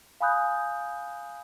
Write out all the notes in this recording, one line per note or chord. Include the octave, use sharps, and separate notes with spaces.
F5 G#5 B5 D#6 F#6 G6